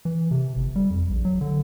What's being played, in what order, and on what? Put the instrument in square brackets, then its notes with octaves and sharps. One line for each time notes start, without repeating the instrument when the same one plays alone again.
[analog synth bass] E3
C3
G1
G3
F2
A#1
F#3
D3